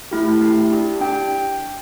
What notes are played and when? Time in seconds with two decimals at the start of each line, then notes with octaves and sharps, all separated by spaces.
0.11 A3 E4 G4
0.40 A3 E4 G4
0.70 D4 G4
1.01 D4 G4 G5